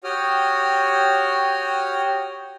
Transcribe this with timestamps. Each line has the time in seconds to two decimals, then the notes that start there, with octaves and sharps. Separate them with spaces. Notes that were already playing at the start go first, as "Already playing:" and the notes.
0.04 F#4 G4 C#5 G5 D#6 F6